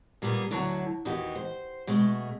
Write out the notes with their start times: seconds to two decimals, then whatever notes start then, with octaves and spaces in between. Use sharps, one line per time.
0.22 A#2 G3 A#3 B3 G#4
0.51 D2 D3 F#3 E4 G#5 A5
1.05 D#2 E3 D#4 F#4 G4
1.36 C5
1.87 B2 G#3 A3